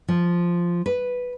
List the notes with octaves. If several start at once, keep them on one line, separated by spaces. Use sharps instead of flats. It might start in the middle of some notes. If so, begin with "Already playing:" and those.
F3
B4